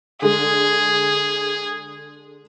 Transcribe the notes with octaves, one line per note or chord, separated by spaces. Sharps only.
D3 G#3 G#4